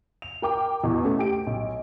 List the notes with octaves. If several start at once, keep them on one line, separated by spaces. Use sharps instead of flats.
F7
A#4 G5 D6
E2 B2
A3 C#4
G4 D7
B1